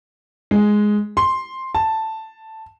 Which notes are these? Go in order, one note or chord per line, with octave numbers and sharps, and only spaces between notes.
G#3
C6
A5